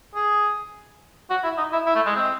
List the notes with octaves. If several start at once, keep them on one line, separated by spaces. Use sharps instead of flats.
G#4
F#4
E4
D#4
E4
E4
A3
G#3
C4